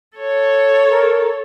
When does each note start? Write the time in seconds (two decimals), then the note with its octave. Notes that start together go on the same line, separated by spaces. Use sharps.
0.17 A4 C#5
0.91 A#4